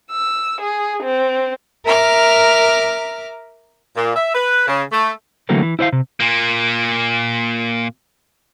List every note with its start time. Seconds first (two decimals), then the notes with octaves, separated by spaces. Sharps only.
0.11 E6
0.60 G#4
1.03 C4
1.85 A#4 E5 A#5 D6 F6
3.97 A#2
4.16 E5
4.35 B4
4.68 C#3
4.93 A3
5.49 D3 E3 F#3 A3 A#3 C4
5.63 E3
5.79 E4 C5 D5 F5
5.93 C3
6.20 A#2 A#3